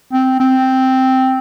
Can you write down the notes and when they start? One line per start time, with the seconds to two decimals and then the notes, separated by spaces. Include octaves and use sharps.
0.13 C4
0.40 C4